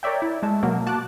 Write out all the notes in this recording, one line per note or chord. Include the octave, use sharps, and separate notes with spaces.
A#4 C#5 D5 E5 G5
E4
G#3 A3 A5
B2 F#3 A#3
F#4 A5 D6 F#6